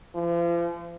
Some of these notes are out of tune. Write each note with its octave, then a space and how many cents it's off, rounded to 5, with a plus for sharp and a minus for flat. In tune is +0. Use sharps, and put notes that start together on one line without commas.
F3 -40